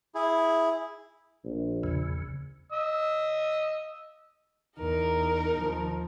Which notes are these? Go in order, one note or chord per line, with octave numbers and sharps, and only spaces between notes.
E4 G#4
A#1
E2 C#3
D#5 E6
E2 D#4 A#4
D#2 F3